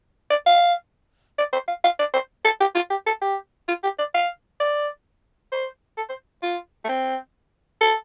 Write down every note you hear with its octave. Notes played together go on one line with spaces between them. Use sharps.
D5
F5
D5
C5
F5
F5
D5
C5
A4
G4
F4
G4
A4
G4
F4
G4
D5
F5
D5
C5
A4
C5
F4
A3
C4
A4